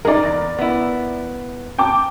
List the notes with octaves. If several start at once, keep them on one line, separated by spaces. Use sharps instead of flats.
G#3 D#4 A#4 D5
E2
B3 E4
G5 A5 D6